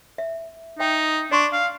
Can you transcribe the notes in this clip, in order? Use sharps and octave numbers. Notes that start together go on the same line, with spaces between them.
E5
D#4 E5 G5
D4 D5 C6 C#6
F5